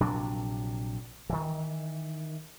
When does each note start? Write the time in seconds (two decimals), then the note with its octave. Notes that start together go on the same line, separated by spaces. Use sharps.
0.01 A#1 C3 F#3 D4
1.30 D#3 E3